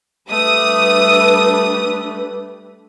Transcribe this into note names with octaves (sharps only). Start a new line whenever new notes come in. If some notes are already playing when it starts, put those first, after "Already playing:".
G3 A3 D4 B4 D#6